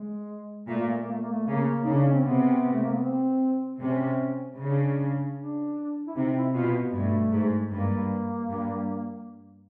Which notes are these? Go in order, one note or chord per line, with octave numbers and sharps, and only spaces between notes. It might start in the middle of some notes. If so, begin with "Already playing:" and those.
Already playing: G#3
A#2 A3
A#3
A3
A#3
A3
A#3
A3
C#3 A#3
C#3 D#4
D4
C#4
C4
C3 B3
A3
A#3
B3
C4
C3 C#4
C#3 D4
D4
E4
C3 D#4
E4
B2 F4
G2 A3
G#2
G2 A#3
G2